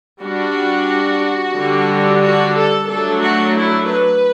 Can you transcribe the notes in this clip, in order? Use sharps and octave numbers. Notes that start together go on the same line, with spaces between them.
G3 D4 F#4
D3 G3 D4
F#4
A4
F#3 A3 D4 A4
F#4
E4
B4